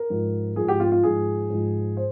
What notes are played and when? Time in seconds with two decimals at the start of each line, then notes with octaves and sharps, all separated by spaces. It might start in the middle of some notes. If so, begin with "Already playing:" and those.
Already playing: A#4
0.10 G#2 F3
0.56 G#2 F3 G#4
0.68 G4
0.80 F4
0.92 F4
1.03 G#2 F3 G#4
1.50 G#2 F3
1.97 C5